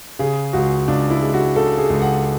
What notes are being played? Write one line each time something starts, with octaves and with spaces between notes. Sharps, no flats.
C#3 G#4
C#2 F#4
C#2 D4
E4
G#3
F#4
C#3 A4
G#4
C#2
F#5